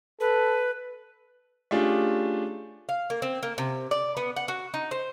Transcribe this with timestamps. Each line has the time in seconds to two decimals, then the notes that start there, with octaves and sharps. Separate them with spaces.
0.20 A4 B4
1.71 A3 C#4 D4 F4 G4 G#4
2.89 F5
3.10 A#3
3.22 C4
3.43 A#3
3.58 C3
3.91 D5
4.17 B3
4.36 F#5
4.48 F#4
4.74 D#4
4.91 C5